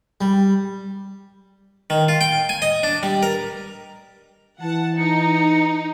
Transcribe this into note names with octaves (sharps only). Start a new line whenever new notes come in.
G3
D#3
F4
G5
G#5
D#5
D4
G3
A#4
E3 F#5 A5
D#4 C#7